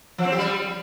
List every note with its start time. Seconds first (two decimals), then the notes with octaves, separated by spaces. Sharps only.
0.18 F3
0.25 C4
0.32 G4
0.39 G3